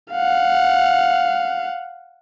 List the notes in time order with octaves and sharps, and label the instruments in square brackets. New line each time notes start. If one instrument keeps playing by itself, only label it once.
[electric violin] F5 F#5